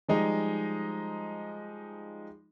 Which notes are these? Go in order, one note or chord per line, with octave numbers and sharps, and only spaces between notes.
F3 G3 G#3 D#4